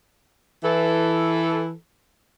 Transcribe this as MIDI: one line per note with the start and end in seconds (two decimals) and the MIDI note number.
0.63 1.72 52
0.63 1.72 69